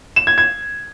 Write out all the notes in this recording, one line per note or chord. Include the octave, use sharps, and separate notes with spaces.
E7
G#6
G#6